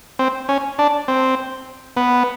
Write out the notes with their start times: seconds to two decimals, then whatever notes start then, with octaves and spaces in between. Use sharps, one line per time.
0.19 C4
0.49 C#4
0.79 D4
1.08 C4
1.97 B3